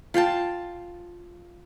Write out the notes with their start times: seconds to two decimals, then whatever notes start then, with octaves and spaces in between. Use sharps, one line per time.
0.14 F4 F5 G5 A5